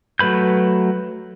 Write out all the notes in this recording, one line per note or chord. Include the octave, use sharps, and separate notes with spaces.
F#3 A3 B4 B5 G6